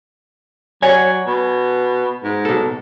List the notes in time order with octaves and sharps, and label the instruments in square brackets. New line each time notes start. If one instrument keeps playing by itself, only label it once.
[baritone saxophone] F#3 [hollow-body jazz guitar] C#5 D5 F#5 [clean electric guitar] G#5
[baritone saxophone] B2
G#2
[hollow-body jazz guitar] B2 A4